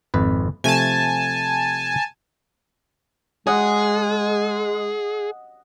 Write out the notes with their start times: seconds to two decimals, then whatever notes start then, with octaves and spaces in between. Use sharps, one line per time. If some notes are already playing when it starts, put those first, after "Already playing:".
0.14 G#1 F2 B4
0.64 C3 F3 A3 G#5 A5
3.47 G#3 G#4 D#5 F#5